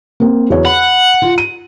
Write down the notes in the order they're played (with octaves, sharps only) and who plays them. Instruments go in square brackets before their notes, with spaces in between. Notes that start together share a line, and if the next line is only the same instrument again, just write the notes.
[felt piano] A#3 C4
E2 F#4 C#5
[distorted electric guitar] F#5 [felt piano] B5
[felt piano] F4
D#7